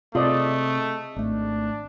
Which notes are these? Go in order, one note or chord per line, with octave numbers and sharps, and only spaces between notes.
C3 A3 F4 G#4 D5 D#5
G#1 A3 D4